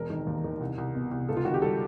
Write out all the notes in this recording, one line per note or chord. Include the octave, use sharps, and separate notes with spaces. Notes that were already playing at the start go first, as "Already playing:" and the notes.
Already playing: E1 A#4
D#3
D#2
D#3
C2
C2
B2
C2
C#2 A4
F4
D#3 F#4
G4
G3 A4